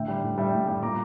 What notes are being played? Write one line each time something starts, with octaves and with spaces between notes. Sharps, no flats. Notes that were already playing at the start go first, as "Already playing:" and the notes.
Already playing: A2 D3 E5 G5
G3
A2
G3 E5 G5
A2
G3
A#2 A#5 D6